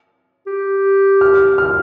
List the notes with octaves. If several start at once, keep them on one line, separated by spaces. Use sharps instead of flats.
G4
F6
F6